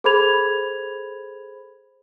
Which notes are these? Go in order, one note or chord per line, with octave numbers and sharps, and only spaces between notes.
G#4 A4 C5 B5 G#6 F7